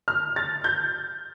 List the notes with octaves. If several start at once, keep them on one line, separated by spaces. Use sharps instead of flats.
F6
A6
G6